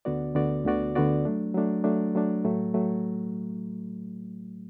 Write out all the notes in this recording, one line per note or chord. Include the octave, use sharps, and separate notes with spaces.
D2 D3 B3 F#4 D5
D2 D3 B3 F#4 D5
D2 D3 B3 F#4 D5
D2 D3 B3 F#4 D5
F#3 A3 D4
F#3 A3 D4
F#3 A3 D4
F#3 A3 D4
A2 F#3 A3
F#3 A3